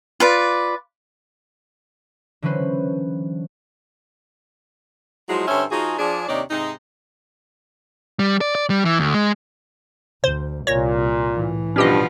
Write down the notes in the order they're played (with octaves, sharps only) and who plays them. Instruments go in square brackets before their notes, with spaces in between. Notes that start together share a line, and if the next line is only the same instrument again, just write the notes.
[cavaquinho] F4 B4 D5
[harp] D3 E3 F#3 C#4 B4 C5
[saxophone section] F3 F#3 G#3 D#4 E4 F#4
G2 D3 C#4 C5 C#5 E5
F3 D#4 F4 F#4 G#4
F3 D4 G#4
D#2 C3 D4 D#4 C#5 D5
G#2 C3 G#3 D#4
[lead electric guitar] G3
D5
D5
G3
E3
D2
G#3
[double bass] D2 [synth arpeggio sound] C5
[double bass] C2 [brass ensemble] A#2 [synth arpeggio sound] C#5 A#6
[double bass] A2 E3
[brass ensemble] G2 [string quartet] B2 F3 B3 [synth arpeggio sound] C#4 G4 D#5